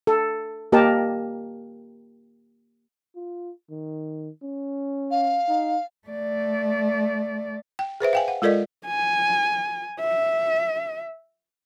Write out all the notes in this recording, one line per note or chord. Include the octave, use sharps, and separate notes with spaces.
A4
A#3 G4 A#4 D#5 A5
F4
D#3
C#4
F5
D#4
A3 D5
G5
G#4 B4 C5 E5
F5 G5 G#5
F#5
G#3 F4 A4 A#4 D5 D#5
G#5
E5